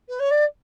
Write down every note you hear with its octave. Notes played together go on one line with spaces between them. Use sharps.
B4
C#5
D5